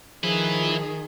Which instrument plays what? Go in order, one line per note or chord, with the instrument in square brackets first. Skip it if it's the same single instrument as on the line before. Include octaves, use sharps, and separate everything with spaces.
[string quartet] D#3 [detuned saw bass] F3 [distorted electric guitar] E4 B4 [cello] G#4